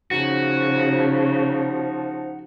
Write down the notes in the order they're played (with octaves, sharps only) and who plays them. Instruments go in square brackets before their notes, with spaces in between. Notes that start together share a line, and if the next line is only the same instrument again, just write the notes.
[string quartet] C#3 [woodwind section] F3 D#4 [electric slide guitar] F#4